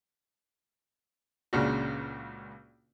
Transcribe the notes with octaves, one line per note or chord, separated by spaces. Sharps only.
C#2 A#2 C#3 C#4 D4 F#4